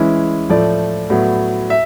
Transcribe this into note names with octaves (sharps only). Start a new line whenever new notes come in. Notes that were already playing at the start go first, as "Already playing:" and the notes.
Already playing: E3 G#3 C#4 E4
A2 F3 A3 D5
A2 F#3 B3
E5